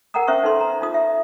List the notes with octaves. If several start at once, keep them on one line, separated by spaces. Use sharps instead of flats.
A#4 F#5 G5 A#5 D#6
C#4 C5 E5 C#6 D#6
D#4 A4 B4 C6
A#5
D#4 F4 D#6
E5